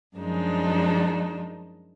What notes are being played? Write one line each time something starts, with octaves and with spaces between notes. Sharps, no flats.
F#2 F3 G#3 D4 D#4